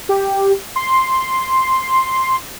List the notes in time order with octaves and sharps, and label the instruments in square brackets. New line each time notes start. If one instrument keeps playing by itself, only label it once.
[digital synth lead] G4
C6